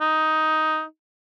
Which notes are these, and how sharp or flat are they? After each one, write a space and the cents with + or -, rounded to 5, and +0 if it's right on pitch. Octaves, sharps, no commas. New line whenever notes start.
D#4 +10